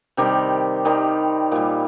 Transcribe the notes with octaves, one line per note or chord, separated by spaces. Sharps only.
C3 D#3 G3 G4
C3 D#3 G3
A#2 G3